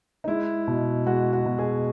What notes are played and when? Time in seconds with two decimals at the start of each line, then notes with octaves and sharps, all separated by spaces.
0.24 D#4
0.28 G#3 E4
0.67 B2
1.06 G#3 F#4
1.33 F#4
1.46 B2
1.58 G#4